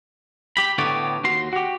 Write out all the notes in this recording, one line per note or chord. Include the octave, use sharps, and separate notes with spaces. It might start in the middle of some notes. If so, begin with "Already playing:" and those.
G4 B5
A2 D3 B3 G4 C#5 D5
D#2 F#4 C6
F#4 G4